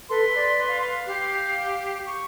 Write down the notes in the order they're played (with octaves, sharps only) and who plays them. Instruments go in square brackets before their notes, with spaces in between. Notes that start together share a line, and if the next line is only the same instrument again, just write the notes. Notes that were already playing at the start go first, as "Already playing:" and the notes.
[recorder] A4 [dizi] B4 [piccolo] C6
[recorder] D5
F5
[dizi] G4 [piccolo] C7
[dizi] C#6